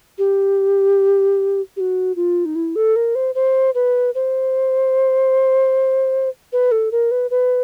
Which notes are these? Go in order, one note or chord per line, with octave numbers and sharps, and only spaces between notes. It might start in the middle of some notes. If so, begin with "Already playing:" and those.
G4
G4
F#4
F4
D#4
E4
A4
A#4
C5
C5
B4
C5
B4
A4
A#4
B4
B4